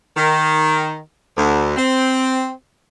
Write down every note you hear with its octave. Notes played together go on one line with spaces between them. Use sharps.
D#3
D2
C4